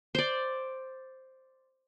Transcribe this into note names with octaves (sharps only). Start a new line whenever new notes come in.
C5 D5